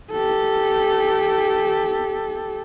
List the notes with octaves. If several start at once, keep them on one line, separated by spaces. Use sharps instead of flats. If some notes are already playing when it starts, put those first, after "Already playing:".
G4 A4